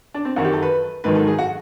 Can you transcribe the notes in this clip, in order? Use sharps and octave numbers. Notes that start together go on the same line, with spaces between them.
D4
C4
F#2 D#3 F#3 F#4
G4
A4
B4
G#2 D#3 F#3 B4
A4
G#4
F#4